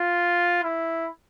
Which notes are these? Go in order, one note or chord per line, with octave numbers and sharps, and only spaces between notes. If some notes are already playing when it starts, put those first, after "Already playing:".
Already playing: F4
E4